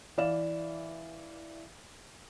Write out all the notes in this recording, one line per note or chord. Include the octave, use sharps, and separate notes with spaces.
E3 D5 F5 E7